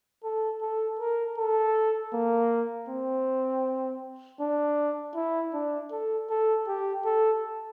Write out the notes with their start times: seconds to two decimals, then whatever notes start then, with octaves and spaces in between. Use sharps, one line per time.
0.24 A4
0.62 A4
0.99 A#4
1.38 A4
2.13 A#3
2.89 C4
4.40 D4
5.15 E4
5.54 D4
5.91 A4
6.30 A4
6.67 G4
7.05 A4